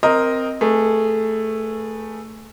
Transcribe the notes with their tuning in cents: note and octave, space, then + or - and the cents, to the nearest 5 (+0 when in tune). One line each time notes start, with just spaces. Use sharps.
C4 +0 A#4 +0 D#5 +0
A3 +0 G#4 -5 B4 -35